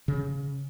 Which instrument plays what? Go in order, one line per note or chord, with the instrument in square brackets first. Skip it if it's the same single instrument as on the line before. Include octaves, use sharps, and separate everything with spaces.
[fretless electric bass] C#3